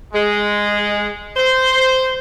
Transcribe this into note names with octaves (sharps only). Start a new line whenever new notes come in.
G#3
C5